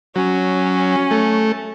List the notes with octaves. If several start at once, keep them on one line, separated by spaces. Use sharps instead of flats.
F#3 C#4
A3